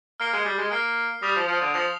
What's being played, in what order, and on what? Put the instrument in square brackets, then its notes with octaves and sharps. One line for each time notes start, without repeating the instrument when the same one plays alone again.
[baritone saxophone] A#3 [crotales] F6 C7 G7
[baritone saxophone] G#3
G3
G#3
[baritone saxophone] A#3 [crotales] F6 C7 G7
[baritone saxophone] G3 [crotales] D#6 A#6 F7
[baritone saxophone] F3
F3
D3
[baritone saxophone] F3 [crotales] D#6 A#6 F7